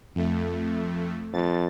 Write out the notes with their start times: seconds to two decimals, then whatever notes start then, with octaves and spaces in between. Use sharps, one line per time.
0.15 F2 A3
1.33 F2 A6